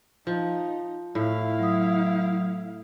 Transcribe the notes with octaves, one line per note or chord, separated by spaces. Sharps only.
F3 D#4
A2 E4 F5
F#3 D#6